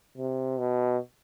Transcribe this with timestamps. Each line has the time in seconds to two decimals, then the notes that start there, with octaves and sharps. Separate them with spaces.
0.18 C3
0.59 B2